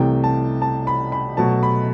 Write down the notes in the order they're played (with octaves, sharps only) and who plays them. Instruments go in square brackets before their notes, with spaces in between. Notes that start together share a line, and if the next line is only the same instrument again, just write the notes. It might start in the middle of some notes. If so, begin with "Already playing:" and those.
Already playing: [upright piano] C2 C3 E3 A3 G5
A5
A5
B5
B5
B2 F#3 A3 A5
B5